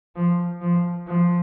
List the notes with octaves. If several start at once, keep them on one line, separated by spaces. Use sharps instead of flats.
F3
F3
F3